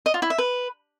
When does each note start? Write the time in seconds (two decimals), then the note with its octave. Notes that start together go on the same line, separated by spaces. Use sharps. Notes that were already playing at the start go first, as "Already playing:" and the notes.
0.06 D#5
0.14 F4
0.22 E4
0.30 E5
0.38 B4